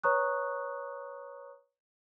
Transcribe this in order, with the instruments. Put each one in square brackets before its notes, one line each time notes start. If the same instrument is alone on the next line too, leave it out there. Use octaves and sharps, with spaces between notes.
[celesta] B4 C#5 A#5 C#6 D#6 F#6